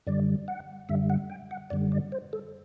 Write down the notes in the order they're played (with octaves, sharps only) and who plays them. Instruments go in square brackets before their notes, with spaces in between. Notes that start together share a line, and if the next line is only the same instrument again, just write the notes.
[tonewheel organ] F#2 D3 G3 D5
F#5
F#2 D3 G3 E5
F#5
G5
F#5
F#2 D3 G3 D5
D5
C5
A4